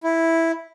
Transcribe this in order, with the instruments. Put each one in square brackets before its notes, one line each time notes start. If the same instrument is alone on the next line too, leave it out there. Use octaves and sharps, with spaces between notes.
[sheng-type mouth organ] E4